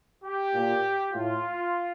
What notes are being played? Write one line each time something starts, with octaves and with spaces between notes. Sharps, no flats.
G4
A#2
A2 F4